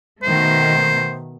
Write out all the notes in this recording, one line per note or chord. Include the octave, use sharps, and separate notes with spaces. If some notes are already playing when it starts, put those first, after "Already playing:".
B2 D#3 A3 C5